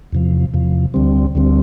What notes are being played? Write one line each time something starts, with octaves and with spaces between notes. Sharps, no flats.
E2 C3 F3
E2 C3 F3
D2 D3 G3 C4
D2 D3 G3 C4